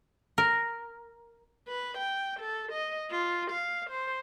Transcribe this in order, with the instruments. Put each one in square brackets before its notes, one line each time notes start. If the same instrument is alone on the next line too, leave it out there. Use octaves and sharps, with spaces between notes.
[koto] A#4
[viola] B4
G5
A4
D#5
F4
F5
C5